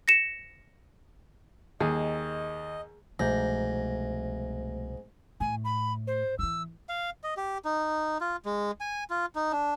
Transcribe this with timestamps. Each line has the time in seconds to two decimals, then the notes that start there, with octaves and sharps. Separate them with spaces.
0.08 A#6 C#7 E7
1.80 D#2 G#4 D#5
3.19 C2 G#2 B2 F3 A3 A#6
5.40 A2 G#5
5.64 B5
6.07 C5
6.39 E3 F3 E6
6.89 F5
7.24 D#5
7.37 G4
7.65 D#4
8.21 F4
8.45 G#3
8.80 G#5
9.10 F4
9.35 D#4
9.52 D4